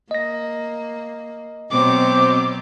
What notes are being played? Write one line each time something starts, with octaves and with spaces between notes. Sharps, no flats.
A#3 D#5 A#6
B2 F#3 C4 D6